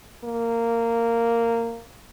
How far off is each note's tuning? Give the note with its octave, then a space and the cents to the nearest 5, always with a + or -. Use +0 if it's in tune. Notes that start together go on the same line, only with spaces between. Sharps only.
A#3 -10